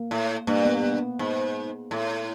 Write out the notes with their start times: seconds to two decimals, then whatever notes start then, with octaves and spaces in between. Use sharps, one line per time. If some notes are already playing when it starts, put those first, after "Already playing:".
Already playing: A#3
0.11 A2
0.47 G2 A#3
0.65 B3
0.83 B3
1.19 G#2
1.91 A2